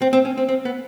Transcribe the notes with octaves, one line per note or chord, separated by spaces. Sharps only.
C4
C4
C#4
C4
C4
B3